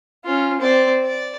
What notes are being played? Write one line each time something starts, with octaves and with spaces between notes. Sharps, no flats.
C#4 F4
C4 D5
D5